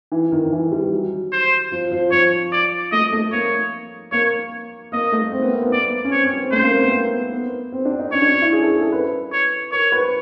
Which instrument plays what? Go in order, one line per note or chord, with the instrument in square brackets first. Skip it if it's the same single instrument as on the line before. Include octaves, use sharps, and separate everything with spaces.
[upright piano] E3
D#3
D#3
E3
G3
F#3
[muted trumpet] C5
[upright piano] F3
F3
[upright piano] F3 [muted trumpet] C#5
[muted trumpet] D5
[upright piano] A3 [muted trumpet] D#5
[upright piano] A3
[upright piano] A#3 [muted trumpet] C#5
[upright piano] A#3 [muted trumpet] C#5
[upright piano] A#3 [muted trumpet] D#5
[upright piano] A3
C4
B3
A#3
B3
[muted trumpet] D5
[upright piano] C#4
[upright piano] C4 [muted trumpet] C#5
[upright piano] C#4
C4
[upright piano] A3 [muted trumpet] C5
[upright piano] A#3
C4
B3
A#3
B3
B3
C4
D4
D#4
[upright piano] C#4 [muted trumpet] C#5
[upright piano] D4
E4
G#4
A4
G#4
A4
B4
[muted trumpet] C#5
[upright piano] A#4 [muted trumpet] C#5
[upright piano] B4